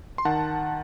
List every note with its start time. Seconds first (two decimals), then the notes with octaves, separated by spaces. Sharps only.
0.18 C6
0.25 D#3 F#5 A5